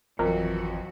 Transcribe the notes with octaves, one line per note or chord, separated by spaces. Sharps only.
G#1 F2 E3 F#3 F#4 A#4